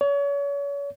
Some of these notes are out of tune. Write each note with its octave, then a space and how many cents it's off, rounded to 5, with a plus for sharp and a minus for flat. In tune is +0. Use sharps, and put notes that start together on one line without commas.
C#5 +35